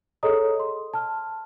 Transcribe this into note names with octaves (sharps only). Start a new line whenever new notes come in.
G#4 A4 C#5 D#5 A#5 D#6
C6
A5 F6